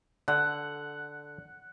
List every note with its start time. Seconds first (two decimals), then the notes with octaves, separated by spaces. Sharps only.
0.28 D3 F#5